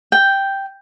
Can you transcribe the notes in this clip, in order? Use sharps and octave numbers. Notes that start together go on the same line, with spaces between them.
G5